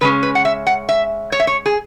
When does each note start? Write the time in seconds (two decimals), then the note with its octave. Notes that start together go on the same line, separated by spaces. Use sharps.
0.01 C#3 G#3 C#4 B4
0.23 B4
0.35 F#5
0.45 E5
0.67 F#5
0.89 E5
1.32 C#5
1.40 E5
1.47 C#5
1.66 G#4